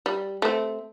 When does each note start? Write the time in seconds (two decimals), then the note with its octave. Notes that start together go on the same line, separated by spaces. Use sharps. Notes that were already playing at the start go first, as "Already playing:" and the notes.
0.06 G3
0.42 A3 C4